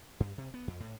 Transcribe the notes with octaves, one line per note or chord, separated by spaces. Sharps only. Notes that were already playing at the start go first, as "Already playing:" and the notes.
G2
C3
B3
F2
A2